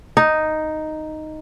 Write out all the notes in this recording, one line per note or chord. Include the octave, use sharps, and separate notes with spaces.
D#4